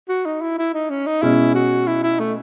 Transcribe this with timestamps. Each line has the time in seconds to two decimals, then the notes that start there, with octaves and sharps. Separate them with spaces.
0.09 F#4
0.25 D#4
0.41 E4
0.58 E4
0.74 D#4
0.90 C#4
1.06 D#4
1.22 B2 G#3 C#4 E4
1.55 F#4
1.87 E4
2.03 E4
2.19 A3